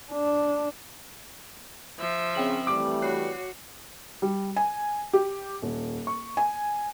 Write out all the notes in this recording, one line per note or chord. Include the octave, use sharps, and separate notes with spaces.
D4
F3 E5
C#3 C4 G5 F#7
E3 G3 A3 D6
F#4 C#5 F#6 C7
G3
G#5
G4
D#1
C#6
G#5